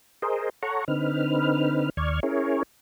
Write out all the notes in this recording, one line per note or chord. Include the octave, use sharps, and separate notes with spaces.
G#4 A#4 C5 D#5
A4 C#5 F#5 A#5 C#6
D3 C4 D#4 B4 F6
D#2 D5 C#6 F6 G#6
C#4 E4 G#4 A#4 C#5